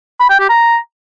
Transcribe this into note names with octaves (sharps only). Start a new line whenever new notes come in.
B5
G5
G4
A#5